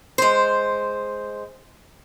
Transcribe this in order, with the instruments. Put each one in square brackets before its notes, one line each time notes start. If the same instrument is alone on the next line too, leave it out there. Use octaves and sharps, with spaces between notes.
[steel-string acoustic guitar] G#3 C5